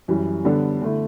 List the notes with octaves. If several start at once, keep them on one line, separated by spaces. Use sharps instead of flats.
F#2 E3 G3
D3 G3 B3 D4 A4
D3 A3 E4